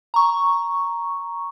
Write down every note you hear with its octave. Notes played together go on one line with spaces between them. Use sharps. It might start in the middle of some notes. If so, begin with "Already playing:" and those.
A#5 C#6